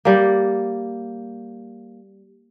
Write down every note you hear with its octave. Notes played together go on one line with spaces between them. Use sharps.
G3 A#3